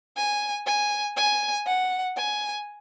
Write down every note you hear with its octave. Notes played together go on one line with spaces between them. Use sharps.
G#5
G#5
G#5
F#5
G#5